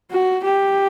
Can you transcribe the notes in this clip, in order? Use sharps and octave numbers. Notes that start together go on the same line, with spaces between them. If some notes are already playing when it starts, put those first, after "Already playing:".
F#4
G4